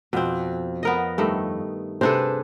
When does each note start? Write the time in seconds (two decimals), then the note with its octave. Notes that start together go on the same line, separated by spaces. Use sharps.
0.13 F2 B2 C4
0.83 B3 A#4 D#5
1.18 G2 D#3 A3
2.01 C3 D4 G#4 A4 B4 C5